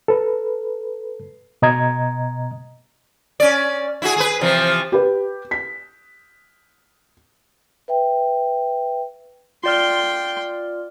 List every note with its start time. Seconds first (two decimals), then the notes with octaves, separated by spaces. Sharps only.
0.08 A4 B4
1.62 B2 D#5 A#5 G#6
3.40 C#4 D5
4.02 E4 F#4 G#4
4.17 G#4 A4 B4
4.41 C3 E3 F3
4.92 G4 B4
5.51 B6
7.88 B4 E5 G5
9.64 F4 D5 G5 C6 F6